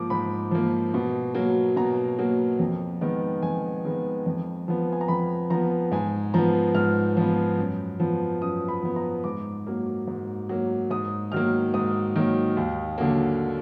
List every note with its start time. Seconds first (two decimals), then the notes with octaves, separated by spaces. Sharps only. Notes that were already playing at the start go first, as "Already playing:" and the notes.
Already playing: G#2 F3 A#3 D6
0.10 G#2 B5
0.51 F3 A#3
0.94 B2
1.34 F#3 A#3
1.76 B2 A#5
2.19 F#3 A#3
2.59 F2
3.01 D#3 G#3 B3
3.42 F2 G#5
3.85 D#3 G#3 B3
4.26 F2
4.68 F3 B3
4.92 G#5
5.01 A#5
5.08 F2 B5
5.50 F3 B3 A#5
5.91 G#2 G#5
6.34 F3 B3 A#5
6.75 G#2 F6
7.17 F3 B3
7.58 F#2
8.00 F3 B3
8.41 F#2 D#6
8.68 B5
8.82 F3 B3
8.96 A#5
9.24 G#2 D6
9.67 F#3 A#3
10.07 G#2
10.49 F#3 A#3
10.90 G#2 D#6
11.32 D#3 F#3 A#3 F6
11.74 G#2 D#6
12.16 D#3 F#3 A#3
12.57 D#2
12.98 D3 F#3 A#3